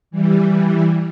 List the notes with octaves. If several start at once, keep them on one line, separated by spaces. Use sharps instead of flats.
E3 G3
E3 G3